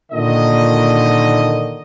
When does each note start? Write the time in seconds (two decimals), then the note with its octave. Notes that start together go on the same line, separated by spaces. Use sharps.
0.12 A#2 D3 D#3 D#5